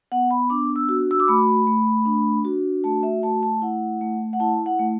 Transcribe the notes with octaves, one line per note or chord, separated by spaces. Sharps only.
B3 F#5
B5
D4 D6
E6
F#4
E6
D6
A3 B5
A3
D4
F#4
A3 A5
E5
A3 A5
A5
E4 F#5
A3
F#5
E4 A5
F#5
A3